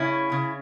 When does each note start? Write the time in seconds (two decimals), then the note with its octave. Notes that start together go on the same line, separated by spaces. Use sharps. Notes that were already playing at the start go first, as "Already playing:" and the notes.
Already playing: C#3 C#4 E4
0.32 C#3